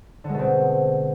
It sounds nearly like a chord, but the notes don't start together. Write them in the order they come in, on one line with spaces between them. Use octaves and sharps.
D3 G#3 B2 C4